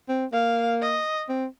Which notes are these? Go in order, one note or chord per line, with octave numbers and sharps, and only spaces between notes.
C4
A#3 F5
D#5
C4